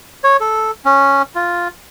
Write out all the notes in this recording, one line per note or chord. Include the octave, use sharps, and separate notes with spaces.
C#5
A4
C#4
F4